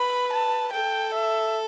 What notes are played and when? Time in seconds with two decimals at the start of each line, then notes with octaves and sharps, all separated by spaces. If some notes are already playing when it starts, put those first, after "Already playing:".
Already playing: B4 B5
0.33 A5
0.73 A4 G5
1.14 E5